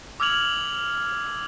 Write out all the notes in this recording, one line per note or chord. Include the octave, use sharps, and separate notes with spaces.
D6 E6 F6 G#6 F7 F#7